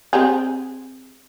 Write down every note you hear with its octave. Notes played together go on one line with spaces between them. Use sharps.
C4 G4 G#4